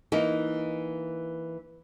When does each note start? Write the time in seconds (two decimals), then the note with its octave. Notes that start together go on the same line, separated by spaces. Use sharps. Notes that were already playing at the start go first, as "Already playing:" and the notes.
0.12 E3 A#3 D#4